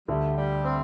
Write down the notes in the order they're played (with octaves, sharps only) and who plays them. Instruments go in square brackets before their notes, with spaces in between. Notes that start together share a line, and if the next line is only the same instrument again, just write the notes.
[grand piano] D2 D3 [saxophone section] G3
[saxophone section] G3
C4